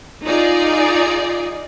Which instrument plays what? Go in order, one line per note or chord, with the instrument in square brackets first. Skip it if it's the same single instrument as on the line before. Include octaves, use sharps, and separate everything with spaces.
[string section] D#4 F4 G#4 D5